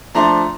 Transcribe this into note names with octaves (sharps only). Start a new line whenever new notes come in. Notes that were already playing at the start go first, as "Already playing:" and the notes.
F3 A3 D4 A#5 C6